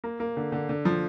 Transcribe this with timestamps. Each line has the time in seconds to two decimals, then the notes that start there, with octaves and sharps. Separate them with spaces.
0.04 A#3
0.20 A#3
0.37 D3
0.52 D3
0.69 D3
0.85 F3